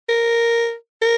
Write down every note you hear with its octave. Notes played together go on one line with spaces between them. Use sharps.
A#4
A#4